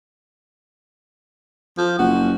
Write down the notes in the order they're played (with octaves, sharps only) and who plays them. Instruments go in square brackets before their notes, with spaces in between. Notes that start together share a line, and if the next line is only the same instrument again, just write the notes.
[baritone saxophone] F3
[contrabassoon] F#1 [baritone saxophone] F#4